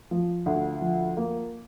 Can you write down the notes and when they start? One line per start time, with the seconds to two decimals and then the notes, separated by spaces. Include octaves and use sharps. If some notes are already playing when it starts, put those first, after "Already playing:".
0.11 F3
0.46 D2
0.81 F3
1.17 A#3